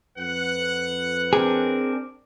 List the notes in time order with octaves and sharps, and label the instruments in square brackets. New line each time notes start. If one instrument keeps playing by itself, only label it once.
[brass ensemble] F2 B4 [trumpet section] F#5
[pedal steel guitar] C4 D4 A#4 [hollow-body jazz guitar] G#4